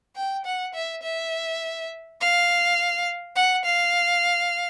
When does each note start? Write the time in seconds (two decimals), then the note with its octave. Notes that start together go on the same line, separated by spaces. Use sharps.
0.16 G5
0.45 F#5
0.74 E5
1.03 E5
2.20 F5
3.36 F#5
3.65 F5